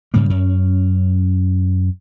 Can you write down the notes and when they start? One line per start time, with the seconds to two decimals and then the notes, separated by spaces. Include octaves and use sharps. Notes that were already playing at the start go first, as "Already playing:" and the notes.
0.14 G#2 C#3 G3 A#3
0.30 F#2 C#4